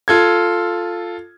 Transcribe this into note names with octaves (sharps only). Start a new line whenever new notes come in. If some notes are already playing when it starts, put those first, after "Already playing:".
F4 A4 G#6